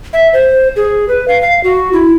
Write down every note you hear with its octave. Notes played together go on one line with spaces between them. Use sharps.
E5
C5
G#4
B4
F5
F5
F#4
E4